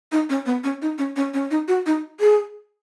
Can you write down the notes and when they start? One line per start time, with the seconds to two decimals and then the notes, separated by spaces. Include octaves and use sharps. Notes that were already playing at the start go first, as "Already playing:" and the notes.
0.12 D#4
0.30 C#4
0.46 B3
0.64 C#4
0.82 D#4
0.98 C#4
1.16 C#4
1.34 C#4
1.51 D#4
1.68 F#4
1.86 D#4
2.20 G#4